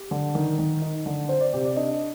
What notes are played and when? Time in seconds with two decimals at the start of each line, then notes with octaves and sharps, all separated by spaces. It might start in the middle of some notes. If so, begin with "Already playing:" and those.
Already playing: G4
0.11 D3
0.35 D#3
0.59 D#3
0.82 D#4
1.06 D3
1.29 C4 C5
1.41 D5
1.53 C3 G4
1.65 D5
1.76 D4 D#5